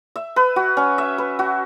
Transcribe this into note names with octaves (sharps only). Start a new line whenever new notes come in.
E5
B4
F#4
C#4
E5
B4
F#4